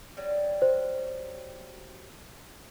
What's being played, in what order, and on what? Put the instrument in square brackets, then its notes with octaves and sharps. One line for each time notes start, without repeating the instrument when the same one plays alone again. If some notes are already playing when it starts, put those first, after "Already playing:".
[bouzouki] F#3 G3
[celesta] C5